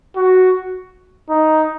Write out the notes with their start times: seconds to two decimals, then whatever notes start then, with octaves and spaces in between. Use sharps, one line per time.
0.16 F#4
1.29 D#4